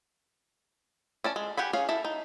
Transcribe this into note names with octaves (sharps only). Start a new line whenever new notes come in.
C#4 D5 A5
G#3
G4 F#5 G#5 B5
C#4 G#4 F5
E4 A4 E5
D#4